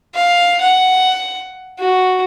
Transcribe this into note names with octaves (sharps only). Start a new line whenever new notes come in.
F5
F#5
F#4